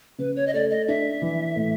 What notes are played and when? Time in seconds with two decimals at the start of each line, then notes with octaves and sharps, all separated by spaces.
0.18 C#3 B4
0.36 C#5
0.47 D#5
0.54 A3 D5
0.70 D#5
0.88 D4 E5
1.22 E3
1.56 A2